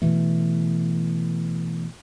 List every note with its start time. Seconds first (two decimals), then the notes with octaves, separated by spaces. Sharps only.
0.02 B2 E3 A3